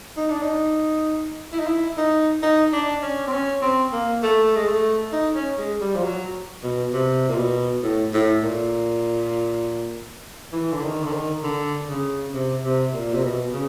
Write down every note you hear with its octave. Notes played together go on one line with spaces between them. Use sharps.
D#4
D4
D#4
E4
D#4
E4
D#4
D#4
D4
C#4
C4
C#4
C4
A#3
A3
G#3
A3
D#4
C#4
G#3
G3
F3
F#3
B2
C3
A#2
B2
A2
A2
A#2
E3
D3
D#3
D3
D#3
D3
C#3
C3
C3
A#2
C3
B2
C#3